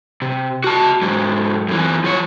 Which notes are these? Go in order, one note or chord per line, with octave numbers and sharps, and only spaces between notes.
C3
F#4 A5
G#2 F#3
F#2 E3
F3 C#5